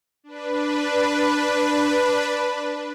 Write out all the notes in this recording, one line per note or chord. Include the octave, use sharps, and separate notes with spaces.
D4 B4